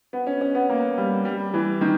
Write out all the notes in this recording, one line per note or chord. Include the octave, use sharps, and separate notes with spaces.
B3
C#4
C#4
B3
A#3
G3
G3
E3
D#3